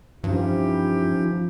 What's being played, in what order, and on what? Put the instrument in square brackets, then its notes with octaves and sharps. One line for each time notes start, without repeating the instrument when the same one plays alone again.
[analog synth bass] G2 [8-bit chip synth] E3 C#4 D#4 [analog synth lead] F3 [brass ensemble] E4 G4